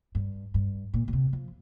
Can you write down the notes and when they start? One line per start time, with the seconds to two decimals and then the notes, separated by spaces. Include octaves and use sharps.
0.15 G2
0.54 G2
0.94 A#2
1.08 A#2
1.13 C3
1.33 F3